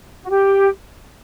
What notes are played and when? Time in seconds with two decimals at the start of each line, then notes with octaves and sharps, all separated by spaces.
0.23 F#4
0.29 G4